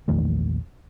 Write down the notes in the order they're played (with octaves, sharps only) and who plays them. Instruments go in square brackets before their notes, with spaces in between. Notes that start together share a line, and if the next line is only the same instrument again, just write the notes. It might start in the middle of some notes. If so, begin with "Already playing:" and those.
[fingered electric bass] A#1 E2 D#3 A3